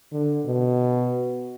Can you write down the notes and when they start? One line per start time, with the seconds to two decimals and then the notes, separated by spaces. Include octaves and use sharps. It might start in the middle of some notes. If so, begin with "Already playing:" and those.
0.12 D3
0.46 B2